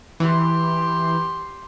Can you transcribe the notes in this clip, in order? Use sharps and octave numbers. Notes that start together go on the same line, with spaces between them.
E3 G4 C6